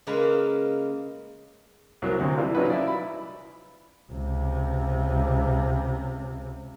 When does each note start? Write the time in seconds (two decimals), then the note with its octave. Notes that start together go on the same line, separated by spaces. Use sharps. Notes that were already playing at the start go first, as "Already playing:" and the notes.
0.07 C#3 G#3 A#3 B4
2.02 C2 F#3 A#3
2.20 D2 C3
2.38 E3 G3 F4
2.55 F3 F#3 C#4 D#4 F4 B4
2.70 E4 D5
2.87 B5
4.12 C#2 C3